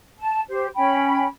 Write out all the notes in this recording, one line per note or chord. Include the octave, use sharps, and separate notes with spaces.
A5
G4 C5
C#4 G5 B5